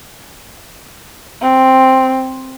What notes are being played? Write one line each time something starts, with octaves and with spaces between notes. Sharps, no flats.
C4